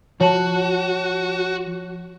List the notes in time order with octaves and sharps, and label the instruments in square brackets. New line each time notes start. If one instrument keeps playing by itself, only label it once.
[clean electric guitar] F3 [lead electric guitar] F#4 [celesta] C#5 A5